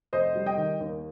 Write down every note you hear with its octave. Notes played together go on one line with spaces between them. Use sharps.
F1 C5 D#5
G3
D#5 G5
D#3
D#2